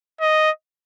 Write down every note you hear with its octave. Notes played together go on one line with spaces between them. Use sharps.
D#5